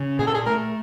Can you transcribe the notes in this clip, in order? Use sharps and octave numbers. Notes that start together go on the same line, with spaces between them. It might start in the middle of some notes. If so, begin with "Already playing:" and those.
Already playing: C#3
A#2 G#4
A4
G#4
A3 A#4